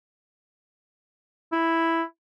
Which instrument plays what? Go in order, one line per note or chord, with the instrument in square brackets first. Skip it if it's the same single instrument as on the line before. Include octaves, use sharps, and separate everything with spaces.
[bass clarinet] E4